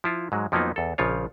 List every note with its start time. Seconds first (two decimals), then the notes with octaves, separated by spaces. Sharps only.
0.04 F3 E4 F4
0.32 G#2 F#3 G#3
0.52 F2 F3 F#3 A#3 B3 D#4
0.76 E2 A4
0.98 A#1 C#3 F3 F4 C#5